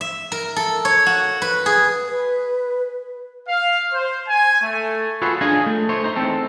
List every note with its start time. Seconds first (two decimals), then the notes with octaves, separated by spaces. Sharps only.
0.01 E5
0.32 A#4
0.56 A4
0.85 C#5
1.06 F#4
1.42 B4
1.66 G#4
2.09 B4
3.49 F5
3.93 C5
4.29 G#5
4.63 A3
5.22 F4 F#4 G#4 A4 B4 C#5
5.41 D4 F4 G#4 C#5 D#5 G#5
5.66 A3
5.89 A3 C5 C#5
6.04 D#4 C5
6.16 E2 C4 A4